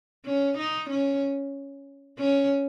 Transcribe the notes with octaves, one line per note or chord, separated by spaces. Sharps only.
C#4
D#4
C#4
C#4